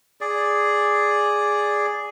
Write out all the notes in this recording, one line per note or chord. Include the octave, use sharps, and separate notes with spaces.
G#4 D5